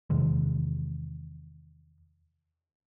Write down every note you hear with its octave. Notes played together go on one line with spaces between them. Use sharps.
E2 C3 D#3 G#3